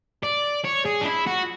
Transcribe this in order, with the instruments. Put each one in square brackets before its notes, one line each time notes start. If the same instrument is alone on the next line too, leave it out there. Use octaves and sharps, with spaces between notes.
[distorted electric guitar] D5
C#5
G#4
D4
E4
F#4